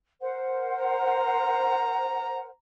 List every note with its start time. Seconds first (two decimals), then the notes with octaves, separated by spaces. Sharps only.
0.20 A#4 C5 F#5
0.85 A#5